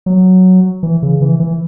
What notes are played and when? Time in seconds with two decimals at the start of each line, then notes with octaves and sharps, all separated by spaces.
0.06 F#3
0.83 E3
1.02 C#3
1.22 E3
1.40 E3